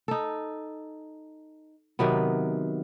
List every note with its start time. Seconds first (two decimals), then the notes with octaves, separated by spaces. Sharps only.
0.08 D#4 A4
1.99 C3 D#3 F#3 B3